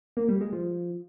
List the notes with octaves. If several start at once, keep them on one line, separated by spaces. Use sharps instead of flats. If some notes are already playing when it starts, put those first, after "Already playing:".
A#3
G3
G#3
F3